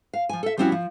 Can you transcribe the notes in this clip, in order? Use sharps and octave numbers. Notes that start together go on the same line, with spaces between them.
F5
F3 G#5
A4 E5
F3 G3 C4 C#4 E4 F#4
F3